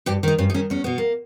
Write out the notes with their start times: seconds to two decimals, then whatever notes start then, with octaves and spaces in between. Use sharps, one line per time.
0.06 G2 G4
0.23 D#3 D#4
0.38 G2 C#4
0.50 D#4
0.54 D#3 C#4
0.70 E2 C#4
0.84 B2 B3
0.98 A#3